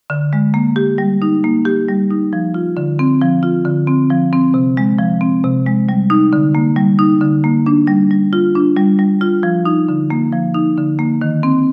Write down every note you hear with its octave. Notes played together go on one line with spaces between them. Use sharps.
D3
G#3
A#3
G4
G3
D#4
A#3
G4
G3
D#4
F3
F4
D3
C4
F3
F4
D3
C4
F3
C4
C3
G#3
F3
C4
C3
G#3
G3
D#4
D3
A#3
G3
D#4
D3
A#3
D4
G3
G3
F4
D4
G3
G3
F4
F3
D#4
D3
A#3
F3
D#4
D3
A#3
D#3
C4